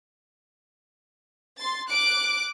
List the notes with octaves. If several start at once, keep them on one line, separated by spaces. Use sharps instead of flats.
C6 A6
D6 F#6 D7